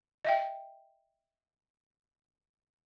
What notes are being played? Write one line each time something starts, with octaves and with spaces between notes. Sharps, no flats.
D#5 E5 G5